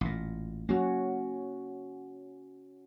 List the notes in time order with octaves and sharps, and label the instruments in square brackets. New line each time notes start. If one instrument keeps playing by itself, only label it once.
[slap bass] A1 A#2
[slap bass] F#3 A#3 [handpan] C#4 F#4